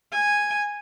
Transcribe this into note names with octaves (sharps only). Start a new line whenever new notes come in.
G#5